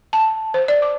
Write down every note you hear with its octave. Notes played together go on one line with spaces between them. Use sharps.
A5
C5
D5
D6